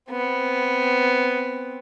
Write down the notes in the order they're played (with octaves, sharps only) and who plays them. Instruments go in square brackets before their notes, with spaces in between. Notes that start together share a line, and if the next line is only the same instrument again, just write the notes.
[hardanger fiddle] B3 C4